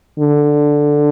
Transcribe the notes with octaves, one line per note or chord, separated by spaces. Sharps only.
D3